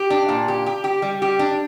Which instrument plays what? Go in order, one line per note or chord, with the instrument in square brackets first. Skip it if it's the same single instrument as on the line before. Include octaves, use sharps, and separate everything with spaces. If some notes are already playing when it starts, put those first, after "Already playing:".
Already playing: [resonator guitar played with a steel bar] G4
D4
A#2
G4
G4
G4
G3
G4
D4